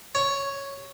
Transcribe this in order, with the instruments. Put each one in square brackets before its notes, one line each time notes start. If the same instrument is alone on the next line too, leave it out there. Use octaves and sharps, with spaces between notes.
[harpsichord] C#5